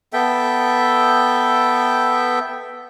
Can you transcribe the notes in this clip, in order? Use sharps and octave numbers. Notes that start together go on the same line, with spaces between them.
B3 A4 E5 G5